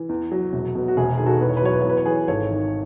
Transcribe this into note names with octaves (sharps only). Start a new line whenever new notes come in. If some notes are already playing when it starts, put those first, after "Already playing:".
Already playing: E3
E2
F#3
E1
B2
F#4
E1 G#4
D#3 G#4
F#4 A4
E2 B4
C#5
B4
F#3 C#5
B4
C#5
E2 B4
C#5
E3 G#4 B4
G#1 A4 C#5
D#3